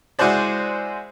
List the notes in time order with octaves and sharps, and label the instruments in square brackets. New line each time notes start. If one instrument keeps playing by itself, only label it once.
[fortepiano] G#3 E4 F#4 C5 D5